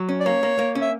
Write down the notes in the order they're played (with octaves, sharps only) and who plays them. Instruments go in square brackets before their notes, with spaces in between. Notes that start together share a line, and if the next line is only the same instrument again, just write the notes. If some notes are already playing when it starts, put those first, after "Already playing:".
Already playing: [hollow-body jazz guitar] F#3
C#4
[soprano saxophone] D5
[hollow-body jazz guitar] A#3 [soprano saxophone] C#5
[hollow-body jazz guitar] A#3
A#3
C#4
[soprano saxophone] E5